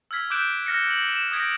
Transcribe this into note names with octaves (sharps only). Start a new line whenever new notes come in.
E6 F6 G#6 B6
D6 E6 F#6 G6 D7 E7
F6 A#6 C#7
F#7
E7
D#6 G6 G#6 A#6 B6 D7